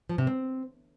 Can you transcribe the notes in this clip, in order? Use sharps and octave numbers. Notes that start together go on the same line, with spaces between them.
F3
C3
C4